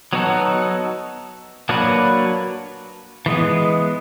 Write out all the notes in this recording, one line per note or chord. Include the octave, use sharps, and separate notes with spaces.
F#3 B3 D#4 F#4 A4
F#3 A#3 D4 F#4 B4
E3 G#3 B3